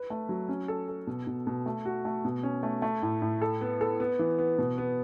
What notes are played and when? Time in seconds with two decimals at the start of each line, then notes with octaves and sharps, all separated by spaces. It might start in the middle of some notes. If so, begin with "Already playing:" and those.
Already playing: B4
0.10 A3
0.29 F#3
0.49 C#4
0.68 A4
0.88 A4
1.07 B2
1.27 B2
1.47 B2
1.66 A3
1.85 F#4
2.05 A3
2.25 B2
2.43 C#4
2.63 A3
2.82 A3
3.02 A2
3.22 A2
3.42 A4
3.61 B3
3.81 A4
4.00 B3
4.19 E3
4.39 B3
4.58 B2
4.78 B3